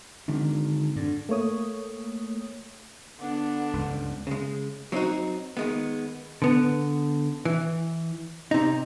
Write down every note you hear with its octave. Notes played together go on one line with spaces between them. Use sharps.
G#1 D3 D#3 D4
G2 D3
A3 A#3 C#5 D#6
D3 B3 D4
C#2 G2
C#3 G#3
F#3 C4 C#4 D#4 F#4
D#3 G#3 B3
D3 B3
E3
C3 D#4